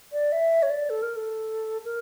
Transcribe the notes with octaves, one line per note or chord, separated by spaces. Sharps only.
D5
E5
C#5
D5
A4
A#4
A4
A#4